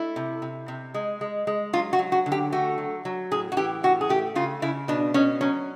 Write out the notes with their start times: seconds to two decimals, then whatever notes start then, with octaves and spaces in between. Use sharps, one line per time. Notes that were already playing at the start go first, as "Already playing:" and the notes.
Already playing: A3 E4
0.16 C3
0.42 C3
0.68 C3
0.94 G#3
1.21 G#3
1.47 G#3
1.73 F#3 F4
1.93 F#4
1.99 F#3
2.12 F#4
2.26 D3
2.32 G4
2.52 A3 F#4
2.78 F#3
3.05 F#3
3.31 A2 G#4
3.52 F#4
3.57 E3 G4
3.83 A2 F#4
4.01 G#4
4.09 A3 G4
4.35 C#3 F4
4.62 C#3 E4
4.88 B2 D4
5.14 B2 C#4
5.41 F#3 C#4